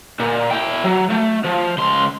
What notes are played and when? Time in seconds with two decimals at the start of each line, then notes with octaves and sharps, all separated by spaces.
0.20 A#2
0.51 E4 G5
0.84 F#3
1.11 A3
1.44 F3
1.78 C#2 C6